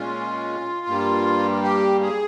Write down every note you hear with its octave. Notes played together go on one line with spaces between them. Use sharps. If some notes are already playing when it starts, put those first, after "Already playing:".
Already playing: A#2 G#3 C#4 F4
G2 G3 A#3
G4
G#4